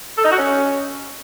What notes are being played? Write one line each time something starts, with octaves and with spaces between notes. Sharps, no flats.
A4
D#4
F#4
C#4